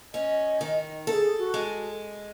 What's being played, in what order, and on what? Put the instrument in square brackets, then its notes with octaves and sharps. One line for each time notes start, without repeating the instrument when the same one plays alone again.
[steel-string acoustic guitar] C#4 [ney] D#5
[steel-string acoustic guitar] D#3
[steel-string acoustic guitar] A4 [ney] A#4
[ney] G#4
F#4
[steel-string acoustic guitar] G#3